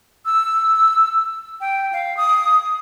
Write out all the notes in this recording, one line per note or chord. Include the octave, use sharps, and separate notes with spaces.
E6
G5
F5
D#6